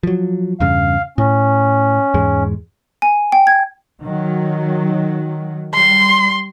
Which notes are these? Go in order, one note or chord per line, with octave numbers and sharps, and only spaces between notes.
F3 F#3
E2 G2 C#3 F5
A2 C#4
E2 G#2 G#3
G#5
G5
G#6
D#3 F#3
G3 C6